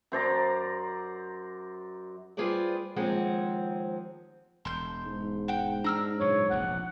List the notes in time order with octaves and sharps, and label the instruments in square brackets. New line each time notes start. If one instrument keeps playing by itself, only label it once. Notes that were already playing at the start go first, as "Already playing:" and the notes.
[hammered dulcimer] F#2 C5 D5 A#5
[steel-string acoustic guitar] G3 F4 G#4 B4 C5 D5
D#2 F3 G#3 C4 F#5
[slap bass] E1 [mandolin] C6 G6
[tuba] G#2
[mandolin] F#5 G5
[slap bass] D4 [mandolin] A#5 E6 F6
[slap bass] F#2 A#2 C#3 [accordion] C#5
[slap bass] F1 A#1 D#2 [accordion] F#5